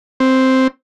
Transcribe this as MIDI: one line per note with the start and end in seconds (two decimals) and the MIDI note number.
0.20 0.67 60